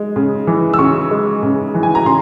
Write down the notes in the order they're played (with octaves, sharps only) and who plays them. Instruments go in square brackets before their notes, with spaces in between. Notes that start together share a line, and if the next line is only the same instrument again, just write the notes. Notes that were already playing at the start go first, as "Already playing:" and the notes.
Already playing: [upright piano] G#3
C#3
E3
E6
C#3 C#6
G#3
C#3
E3
G#5
A#5
C#3 C6